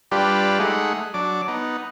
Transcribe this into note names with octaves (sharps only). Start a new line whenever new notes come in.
G3 D4 F4 G4 B4
G#3 A3 D#4 G#4 F#5
F#3 D4 D6
B3 D#4